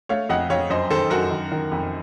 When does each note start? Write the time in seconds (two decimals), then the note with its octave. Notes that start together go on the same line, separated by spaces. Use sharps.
0.09 A3 C#5 F5
0.29 F2 D#5 F#5
0.50 F2 C#5 F5
0.70 F#2 C5 D#5
0.90 D#3 A4 C5
1.10 F#2 F#4 A#4
1.31 D#3
1.52 D#3
1.72 F2